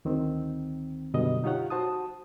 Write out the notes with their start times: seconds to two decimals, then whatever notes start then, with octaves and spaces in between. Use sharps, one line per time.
0.05 D2 D#3 C4
1.14 F#2 B2 D3 G3 D#5
1.44 D#4 F4 G4 C#5 F#5
1.70 F#4 C5 A5 D#6